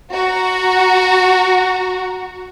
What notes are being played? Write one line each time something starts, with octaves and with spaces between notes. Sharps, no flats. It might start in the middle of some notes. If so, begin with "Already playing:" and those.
F#4 A#5